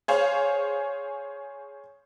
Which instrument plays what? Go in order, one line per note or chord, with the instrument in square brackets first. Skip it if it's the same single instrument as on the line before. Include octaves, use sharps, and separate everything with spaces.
[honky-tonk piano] G#4 C5 C#5 F5